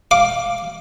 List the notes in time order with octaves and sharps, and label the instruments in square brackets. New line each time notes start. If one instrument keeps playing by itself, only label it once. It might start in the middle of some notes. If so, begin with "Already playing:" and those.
[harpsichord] F5 D6